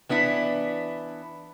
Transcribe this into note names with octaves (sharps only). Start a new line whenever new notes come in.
E3 B3 D4 E4